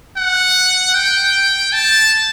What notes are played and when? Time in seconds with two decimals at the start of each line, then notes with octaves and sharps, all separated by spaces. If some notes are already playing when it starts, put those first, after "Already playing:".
0.17 F#5
0.95 G5
1.73 A5